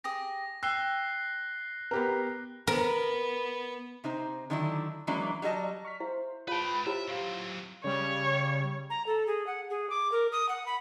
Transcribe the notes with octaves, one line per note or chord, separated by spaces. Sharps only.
G4 G#4 D#6 A#6
G5 E6 F#6 C7 G7
B3 G4 A#4
B3 A#4
C3 D#4 C5
D3 D#3 F#3 D4 E4
E3 F#3 G#3 A#3 C#4 D4
F#3 G3 G#4 D#5 A5
C#6 F6 B6
E4 C5 E5 F5
F4 B4 C#5 G5 A5 B5
E4 G4 C5 C#5 E5
F#3 C4 F5
C#3 G3 C#5
A#5
A4
G#4
F#5
G#4
D6
A#4
D#6
F#5
B5